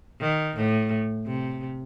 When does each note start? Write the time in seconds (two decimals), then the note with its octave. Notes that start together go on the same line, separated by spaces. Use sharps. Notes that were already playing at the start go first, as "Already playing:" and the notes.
0.21 D#3
0.56 A2
1.27 C3